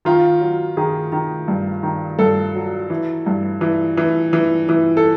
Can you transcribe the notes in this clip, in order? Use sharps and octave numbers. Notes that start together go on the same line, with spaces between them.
D#3 F4
F#3
D#3 G#4
D#3
G2
D#3
G2 A4
F#3
E3
G2
E3
E3
E3
E3
A4